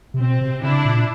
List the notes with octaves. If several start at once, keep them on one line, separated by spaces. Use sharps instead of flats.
C3
B2 C4
C3
C#3 D4 E4
A#2